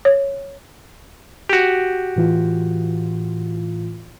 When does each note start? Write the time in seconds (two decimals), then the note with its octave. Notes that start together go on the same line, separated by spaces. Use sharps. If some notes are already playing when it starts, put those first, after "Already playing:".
0.05 C#5
1.49 F#4 G4
2.16 A2 E3 F4